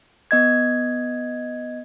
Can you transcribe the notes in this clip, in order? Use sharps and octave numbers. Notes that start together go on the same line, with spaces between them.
B3 D#5 G#6